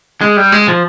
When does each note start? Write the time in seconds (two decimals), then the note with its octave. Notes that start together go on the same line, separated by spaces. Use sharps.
0.21 G#3
0.37 G3
0.52 G#3
0.68 F3